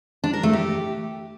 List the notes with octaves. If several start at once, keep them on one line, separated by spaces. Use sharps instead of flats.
D4
A#4
A3
G4